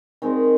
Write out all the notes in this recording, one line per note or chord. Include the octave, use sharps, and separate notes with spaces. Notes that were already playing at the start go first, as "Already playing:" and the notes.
D#3 G#3 C4 D#4